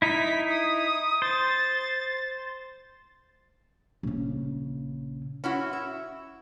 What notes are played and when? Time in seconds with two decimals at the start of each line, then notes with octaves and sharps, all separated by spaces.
0.02 D#4 E4 B6
0.49 D#6
1.22 C5 A6
4.03 A#1 C#3
5.44 C#4 E4 F#4
5.73 E5